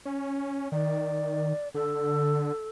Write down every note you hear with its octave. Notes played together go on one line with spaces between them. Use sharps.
C#4
D#3 D5
D3 A4